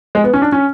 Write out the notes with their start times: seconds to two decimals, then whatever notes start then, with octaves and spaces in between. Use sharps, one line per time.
0.15 G#3
0.24 B3
0.33 C#4
0.42 D4
0.52 C#4